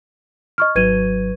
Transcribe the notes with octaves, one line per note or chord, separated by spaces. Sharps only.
D#5 C#6 F6
G#1 F#3 B4 G#6 D#7